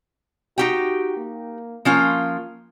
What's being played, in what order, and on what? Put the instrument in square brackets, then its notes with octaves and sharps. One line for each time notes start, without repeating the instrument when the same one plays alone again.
[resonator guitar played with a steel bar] D#4 G4 G5 [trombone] F#4
[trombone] A#3
[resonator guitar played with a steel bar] F3 C#4 F4 [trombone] A#3